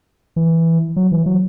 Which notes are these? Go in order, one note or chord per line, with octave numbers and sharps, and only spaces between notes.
E3
F#3
E3
F#3